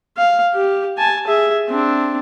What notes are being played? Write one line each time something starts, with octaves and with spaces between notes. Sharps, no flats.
F5
G4
G#5 A5
G#4 E5
C4 D4